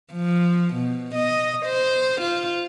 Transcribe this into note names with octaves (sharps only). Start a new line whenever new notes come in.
F3
B2
D#5
C5
F4